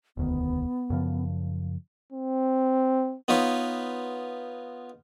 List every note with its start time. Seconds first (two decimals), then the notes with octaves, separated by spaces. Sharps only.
0.17 E1 D2 D#3 B3
0.90 F#2 C#3 F3
2.13 C4
3.28 B3 D#4 F4 B4 C#5